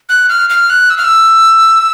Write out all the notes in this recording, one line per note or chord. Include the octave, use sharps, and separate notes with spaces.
F#6
F6
F6
F#6
E6
F6
E6